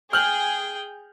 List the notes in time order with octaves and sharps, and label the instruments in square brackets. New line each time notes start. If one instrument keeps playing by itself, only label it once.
[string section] G#4 [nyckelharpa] G5 [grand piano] F6 G6 F#7